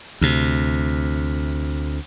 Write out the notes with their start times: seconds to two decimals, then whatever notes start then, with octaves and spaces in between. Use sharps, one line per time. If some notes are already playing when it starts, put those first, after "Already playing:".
0.21 D2 C3